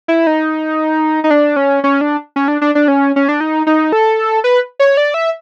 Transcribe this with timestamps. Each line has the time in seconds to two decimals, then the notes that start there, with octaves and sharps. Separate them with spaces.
0.08 E4
0.27 D#4
1.24 D#4
1.30 D4
1.56 C#4
1.84 C#4
2.01 D4
2.36 C#4
2.48 D4
2.61 D4
2.75 D4
2.88 C#4
3.16 C#4
3.29 D4
3.40 D#4
3.67 D#4
3.92 A4
4.44 B4
4.79 C#5
4.97 D5
5.14 E5